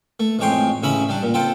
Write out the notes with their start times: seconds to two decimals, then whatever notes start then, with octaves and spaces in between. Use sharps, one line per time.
0.20 A3
0.39 A1 F2 G#3 C#5 G5 C6
0.83 A1 C#3 C#4 E4 E5 B5
1.09 G3 D4
1.23 A#2
1.34 C4 F4 A4 G5